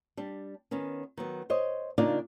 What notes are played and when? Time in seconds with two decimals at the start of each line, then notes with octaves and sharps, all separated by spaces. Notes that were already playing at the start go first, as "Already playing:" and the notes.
0.17 G3 D4
0.71 D#3 B3 C#4
1.17 D#3 F#3 B3
1.50 C5 C#5 D#5
1.98 C#3 A#3 D4 D#4 F4 D5